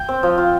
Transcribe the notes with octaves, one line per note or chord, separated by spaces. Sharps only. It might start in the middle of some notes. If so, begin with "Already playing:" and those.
Already playing: G5
C4
F3
F4